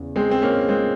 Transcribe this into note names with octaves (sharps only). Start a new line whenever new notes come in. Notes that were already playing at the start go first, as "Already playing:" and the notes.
Already playing: E2 C#3
G#3 C4
C4
A#3 C#4
G#3 C4